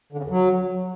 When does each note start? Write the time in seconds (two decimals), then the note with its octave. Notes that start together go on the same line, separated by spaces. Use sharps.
0.13 D3
0.18 C#3
0.24 E2
0.30 F#3